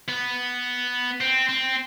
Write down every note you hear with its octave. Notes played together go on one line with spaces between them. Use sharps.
B3
C4
C4